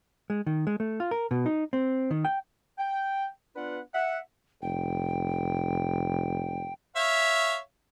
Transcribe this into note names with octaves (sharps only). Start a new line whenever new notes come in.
G#3
D#3
G#3
A3
F4
A#4
B2
D#4
C4
D#3
G5
G5
B3 D4 F4 B4 F#5
E5 F#5
F1 G5
C#5 E5 F5